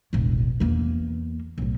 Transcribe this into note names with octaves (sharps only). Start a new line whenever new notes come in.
E1 A1
E2 A#3
B1 A2